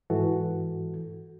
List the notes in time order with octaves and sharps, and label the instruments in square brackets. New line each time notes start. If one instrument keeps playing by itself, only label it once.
[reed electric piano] G#2 E3 F#4 A4